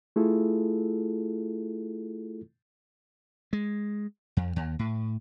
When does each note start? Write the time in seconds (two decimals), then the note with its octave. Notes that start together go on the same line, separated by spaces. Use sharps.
0.16 A3 E4 F4 G#4 A4
3.53 G#3
4.37 F2
4.56 D#2
4.79 A2